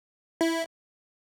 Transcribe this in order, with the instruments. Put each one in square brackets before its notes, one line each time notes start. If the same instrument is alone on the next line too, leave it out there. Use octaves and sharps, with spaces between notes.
[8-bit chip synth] E4